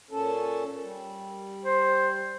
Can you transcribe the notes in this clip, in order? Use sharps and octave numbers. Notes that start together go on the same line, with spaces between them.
A#2 C#4 A4
G3
C5